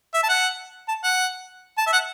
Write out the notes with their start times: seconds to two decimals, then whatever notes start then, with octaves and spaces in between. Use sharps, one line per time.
0.14 E5
0.23 A5
0.29 F#5
0.88 A5
1.04 F#5
1.78 A5
1.87 E5
1.93 F#5